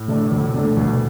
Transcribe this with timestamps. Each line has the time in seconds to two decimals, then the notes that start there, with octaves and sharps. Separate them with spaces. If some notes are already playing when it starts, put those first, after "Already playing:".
Already playing: A2
0.08 D3 A3 D4
0.32 D2
0.54 D3 A3 D4
0.77 D2 B2